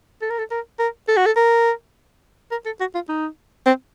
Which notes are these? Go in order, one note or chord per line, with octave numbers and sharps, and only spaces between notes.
A4
A#4
A4
A#4
A#4
A4
F#4
A4
A#4
A#4
A4
F#4
F4
D#4
C4